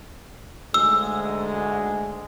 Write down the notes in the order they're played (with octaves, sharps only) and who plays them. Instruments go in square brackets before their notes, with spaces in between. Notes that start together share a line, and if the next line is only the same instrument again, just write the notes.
[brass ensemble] D2 G#2 G#3 [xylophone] E6